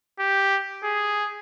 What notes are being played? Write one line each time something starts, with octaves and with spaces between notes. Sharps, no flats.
G4
G#4